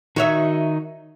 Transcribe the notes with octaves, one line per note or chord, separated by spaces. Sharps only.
D#3 D#4 F#4 C#5 E5